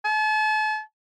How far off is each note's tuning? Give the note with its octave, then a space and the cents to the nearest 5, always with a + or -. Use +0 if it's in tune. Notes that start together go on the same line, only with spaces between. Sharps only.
A5 -40